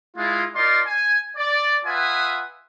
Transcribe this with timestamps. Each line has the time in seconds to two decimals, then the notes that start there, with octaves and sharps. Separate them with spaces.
0.16 G#3 E4 F4
0.55 D#4 F4 A#4 D5 D#5 C6
0.86 G#5
1.37 D5
1.86 F4 B4 E5 F#5 G#5 D#6